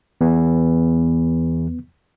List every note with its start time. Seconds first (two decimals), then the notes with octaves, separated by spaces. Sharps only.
0.21 E2 E3 B3